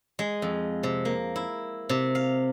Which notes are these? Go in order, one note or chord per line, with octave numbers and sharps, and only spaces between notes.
G#3
F2
C3
A#3
E4
C3
F5